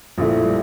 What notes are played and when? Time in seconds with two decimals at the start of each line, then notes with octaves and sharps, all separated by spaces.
0.18 A#1 A#2 F3 A3 E4
0.45 G3